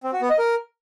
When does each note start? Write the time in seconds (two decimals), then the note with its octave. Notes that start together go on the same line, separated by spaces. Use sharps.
0.04 C4
0.13 F#4
0.21 B3
0.30 D#5
0.39 A#4